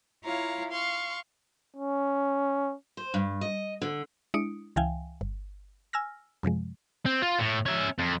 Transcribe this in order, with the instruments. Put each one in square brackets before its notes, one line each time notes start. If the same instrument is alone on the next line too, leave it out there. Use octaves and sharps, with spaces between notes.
[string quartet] E4 F4 C#5 F5 A#5
F5 C6 C#6
[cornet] C#4
[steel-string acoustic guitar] C5
G2
D#5
D3
[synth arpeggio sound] G#3 D4 E4 D#6 C#7 D7
C#2 E3 E5 F5 G5 G#5
G1
G#5 E6 F6 A#6
F#2 C3 F3 G#3
[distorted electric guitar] C4
F4
A2
C#4 E5
F2